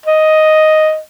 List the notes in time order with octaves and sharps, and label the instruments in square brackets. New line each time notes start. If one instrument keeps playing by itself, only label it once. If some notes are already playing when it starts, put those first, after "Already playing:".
[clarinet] D#5